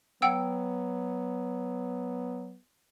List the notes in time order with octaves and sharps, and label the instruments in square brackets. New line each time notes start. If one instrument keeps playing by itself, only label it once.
[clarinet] F#3 [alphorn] B3 [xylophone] F#5 G5 E6